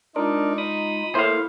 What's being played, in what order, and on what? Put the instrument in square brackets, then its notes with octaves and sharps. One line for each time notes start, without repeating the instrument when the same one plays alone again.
[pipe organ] G#3 F4 [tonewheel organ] D4 A#4 D5 [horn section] D#4
[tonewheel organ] B5 D#6
[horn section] A2 [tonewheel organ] A#3 [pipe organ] E4 [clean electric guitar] C5 F5